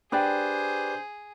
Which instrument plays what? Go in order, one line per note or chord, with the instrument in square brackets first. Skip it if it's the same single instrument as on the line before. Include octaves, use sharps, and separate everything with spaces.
[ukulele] D4 G5 [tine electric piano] G4 B4 D5 [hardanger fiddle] G#4 [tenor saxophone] C5